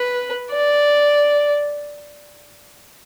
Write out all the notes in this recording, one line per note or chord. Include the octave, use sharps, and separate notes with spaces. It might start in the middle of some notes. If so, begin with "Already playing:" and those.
Already playing: B4
D5